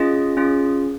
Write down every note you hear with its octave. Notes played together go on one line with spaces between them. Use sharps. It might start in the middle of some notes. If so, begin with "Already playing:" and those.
Already playing: C#4 F4 G#4 D#5
C#4 F4 G#4